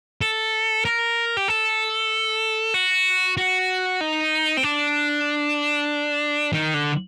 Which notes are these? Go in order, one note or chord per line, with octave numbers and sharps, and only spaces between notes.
A4
A#4
G4
A4
F#4
F#4
D#4
C4
D4
D#3
D3